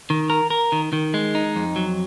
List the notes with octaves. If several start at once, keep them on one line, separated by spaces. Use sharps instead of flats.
D#3
A#4
A#4
D#3
D#3
G#3
D#4
F2
F#3